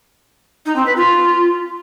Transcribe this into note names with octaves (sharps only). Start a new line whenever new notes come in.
D#4
C4
B4
F4